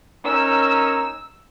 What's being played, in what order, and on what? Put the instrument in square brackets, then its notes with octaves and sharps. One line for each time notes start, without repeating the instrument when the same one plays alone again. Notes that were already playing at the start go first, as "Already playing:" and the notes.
[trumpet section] C#4 D#4 A#4 [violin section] E6